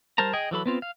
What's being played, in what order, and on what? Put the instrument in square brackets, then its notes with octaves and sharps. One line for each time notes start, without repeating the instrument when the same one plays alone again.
[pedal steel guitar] G3 A#4 C5 A5 A#5
G#4 D#5 G5 G#5
E3 F#3 A4 B5
B3 C4 F4
F5